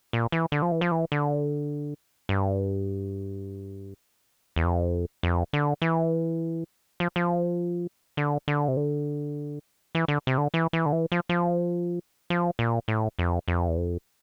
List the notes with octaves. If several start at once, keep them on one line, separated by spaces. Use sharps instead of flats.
A#2
E3
D3
F3
E3
F3
E3
D3
G2
E2
F2
F2
D3
E3
F3
F3
D3
D3
C3
D3
E3
D3
C3
D3
E3
E3
D3
E3
F3
F3
F3
A#2
A2
F2
F2
E2
F2